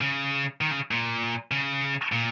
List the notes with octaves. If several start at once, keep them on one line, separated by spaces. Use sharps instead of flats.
C#3
D#3
C#3
A#2
C#3
A#2